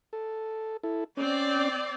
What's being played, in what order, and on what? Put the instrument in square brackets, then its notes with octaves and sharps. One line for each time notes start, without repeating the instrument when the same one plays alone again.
[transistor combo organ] A4
E4 A4
[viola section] C4 D5 [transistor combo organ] C#4